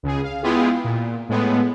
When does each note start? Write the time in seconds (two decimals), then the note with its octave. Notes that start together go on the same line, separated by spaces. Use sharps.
0.03 C#2 C#3 G#4
0.23 F5
0.43 G#3 B3 E4 F4 G4 G#4
0.84 A#2
1.29 A2 G#3 A3 B3